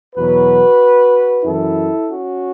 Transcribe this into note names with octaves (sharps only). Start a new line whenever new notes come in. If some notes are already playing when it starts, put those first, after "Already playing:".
E2 B2 F#3 F#4 B4
F#2 E3 E4 A4
C#4 F#4